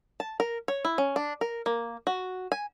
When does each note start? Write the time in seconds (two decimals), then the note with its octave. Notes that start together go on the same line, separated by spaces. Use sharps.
0.20 A5
0.40 A#4
0.68 C#5
0.85 E4
0.98 C#4
1.16 D4
1.41 A#4
1.66 A#3
2.07 F#4
2.52 G#5